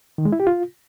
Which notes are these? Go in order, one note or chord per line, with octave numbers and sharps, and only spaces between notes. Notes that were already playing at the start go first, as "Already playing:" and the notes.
D#3
G#3
E4
G4
F4